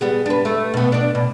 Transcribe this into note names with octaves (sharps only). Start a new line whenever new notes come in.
G3 B3 G#4
D4 B4
A3
B2 B3
D4 D5
B2